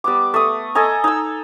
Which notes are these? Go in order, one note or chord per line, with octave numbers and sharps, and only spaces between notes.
G3 B3 D6
A3 D#6
A4 D#5 G#5 A#5
D#4 E6